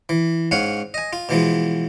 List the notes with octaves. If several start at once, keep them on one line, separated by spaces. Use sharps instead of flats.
E3
G#2 C#4 F5 F#5
D#5 G#5
F4
B2 E3 F3 G#3